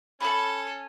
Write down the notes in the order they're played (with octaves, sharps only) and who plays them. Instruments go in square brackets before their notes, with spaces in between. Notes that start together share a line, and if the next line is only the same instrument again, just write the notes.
[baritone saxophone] C#4 [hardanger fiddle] A4 [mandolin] B5 C#6